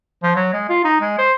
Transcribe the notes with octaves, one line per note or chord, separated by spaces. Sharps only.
F3
F#3
G#3
F4
D#4
G#3
C5